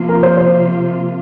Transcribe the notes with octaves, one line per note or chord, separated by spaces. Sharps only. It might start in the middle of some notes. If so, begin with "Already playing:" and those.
Already playing: C3 F3 A#3 F4
A#4
C5
C5